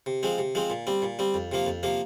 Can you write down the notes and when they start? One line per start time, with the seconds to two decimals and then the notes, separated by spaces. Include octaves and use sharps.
0.06 C3
0.23 F3 G#3 C4
0.38 C3
0.55 F3 G#3 C4
0.70 A#2
0.87 G3 C4
1.02 A#2
1.19 G3 C4
1.34 F2
1.52 C3 F3 A#3
1.66 F2
1.83 C3 F3 A#3